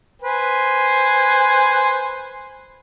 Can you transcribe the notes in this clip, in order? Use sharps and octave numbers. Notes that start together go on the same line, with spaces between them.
B4 C5 G#5